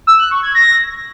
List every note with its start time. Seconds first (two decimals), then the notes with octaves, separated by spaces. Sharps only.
0.07 E6
0.19 F#6
0.31 C#6
0.43 G#6
0.55 A#6